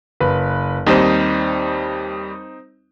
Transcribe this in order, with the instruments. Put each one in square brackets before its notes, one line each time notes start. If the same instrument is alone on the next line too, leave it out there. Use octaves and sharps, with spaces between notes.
[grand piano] F#1 B4
[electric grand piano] D#2 G3 C5 [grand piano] C4 D#4